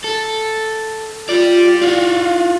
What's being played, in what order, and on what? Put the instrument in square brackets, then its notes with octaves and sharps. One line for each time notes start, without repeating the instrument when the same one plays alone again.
[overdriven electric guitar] A4
[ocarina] F4 [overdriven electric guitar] G4 D5
[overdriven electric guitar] F4 F#4 [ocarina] F5